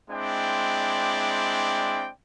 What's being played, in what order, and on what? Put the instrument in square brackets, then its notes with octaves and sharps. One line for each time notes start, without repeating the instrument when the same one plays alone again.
[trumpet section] G#3 C4 D4 E4 D5 G5